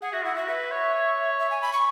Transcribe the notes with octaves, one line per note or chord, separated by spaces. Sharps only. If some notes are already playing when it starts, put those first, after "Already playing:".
G#4 F#5
F#4 E5
E4 F#5
F#4 E5
B4 E5
C#5
C#5
E5
G#5
B5
C#6